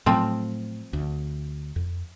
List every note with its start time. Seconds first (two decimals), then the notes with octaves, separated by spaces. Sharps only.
0.06 A2 F3 F#3 A3 C4
0.93 D2
1.76 F2